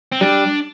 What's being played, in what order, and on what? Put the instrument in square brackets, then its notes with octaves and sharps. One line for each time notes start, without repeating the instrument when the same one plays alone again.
[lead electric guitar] C4
[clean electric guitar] G3 [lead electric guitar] D4